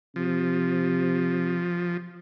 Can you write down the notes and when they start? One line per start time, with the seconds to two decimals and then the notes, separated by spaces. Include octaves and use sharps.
0.16 C3 F3